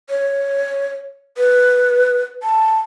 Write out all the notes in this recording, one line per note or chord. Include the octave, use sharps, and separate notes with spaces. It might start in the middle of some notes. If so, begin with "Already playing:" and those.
C#5
B4
A5